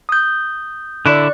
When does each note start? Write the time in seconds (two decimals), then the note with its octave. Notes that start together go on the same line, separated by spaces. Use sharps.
0.09 D#6 G6
1.06 D3 E4 D5 C#6 F#6